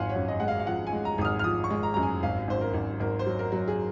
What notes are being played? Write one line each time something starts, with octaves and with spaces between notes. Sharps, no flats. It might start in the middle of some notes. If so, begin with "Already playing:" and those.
Already playing: G#1 F3 F5 F#5 G#5 C6
C#5
F#2
D#5
G#3 F#5
F5
F5
F3 F#5
G#5
G#3
A#5
G#1 D#6
F6
F6
F3 D#6
C#6
G#3
A#5
F#2 A#5
G#5
G#1 F5
G#1 C5
A#4
G#1
G#1 A#4
C5
F#3
A#4
F#3
G#4